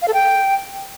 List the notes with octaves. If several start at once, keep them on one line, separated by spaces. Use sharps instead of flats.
F5
A4
G5